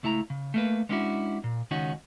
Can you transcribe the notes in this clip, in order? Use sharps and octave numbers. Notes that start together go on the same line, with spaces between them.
C#2 A3 E4 A5 A#5
C#3
A3 A#3 B4
G#3 B3 C#4 D4 E4 F#4
A#2
C#2 D#3 C#4 D#4 F#4